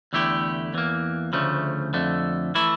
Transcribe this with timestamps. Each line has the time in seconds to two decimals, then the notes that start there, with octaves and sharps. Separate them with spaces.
0.13 E2 D3 A3 E4 G4
0.73 E2 E3 A#3
1.33 D2 C#3 F3 A3
1.94 F2 D3 A3
2.55 E3 A3 E4